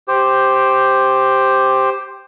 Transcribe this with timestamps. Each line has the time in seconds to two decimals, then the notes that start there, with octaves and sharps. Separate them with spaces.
0.08 G4 C5